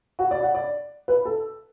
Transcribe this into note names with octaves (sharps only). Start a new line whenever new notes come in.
F#4
D5
F#5
D5
B4
A4